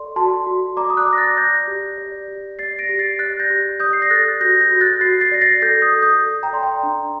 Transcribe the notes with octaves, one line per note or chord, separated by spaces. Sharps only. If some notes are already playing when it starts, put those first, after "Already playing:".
Already playing: A4 D5 C6
F#4 A5 C6
F#4
D5 A#5 D6
D#6
D6 F#6
D5
A#6
F#6 A6
D5 G6 A#6
G4
D5
G4
D5 A6 C7
A#6 D7
G4
A6 C7
D5 F#6 A6
G6 A#6
G4
D5 D#6 G6
C7
A#6
A4 F#6 A6
F#4 G6 A#6
G6 A#6
F#4
F#6 A6
F#4 A6 C7
A6 C7
D5 A#6
A6 C7
A4 G6 A#6
D#6 G6
A4
D#6 G6
A4
G5 A#5
D5 C6
G5 A#5
D4